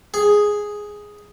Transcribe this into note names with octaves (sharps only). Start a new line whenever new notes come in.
G#4